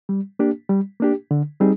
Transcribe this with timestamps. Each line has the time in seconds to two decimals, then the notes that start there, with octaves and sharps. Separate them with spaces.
0.09 G3
0.39 A#3 D4 G4
0.69 G3
1.00 A#3 D4 G4
1.31 D3
1.60 G3 C4 D#4 G#4